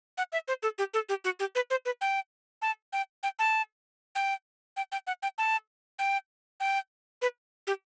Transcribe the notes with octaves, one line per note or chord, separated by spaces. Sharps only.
F#5
E5
C5
A4
G4
A4
G4
F#4
G4
B4
C5
B4
G5
A5
G5
G5
A5
G5
G5
G5
F#5
G5
A5
G5
G5
B4
G4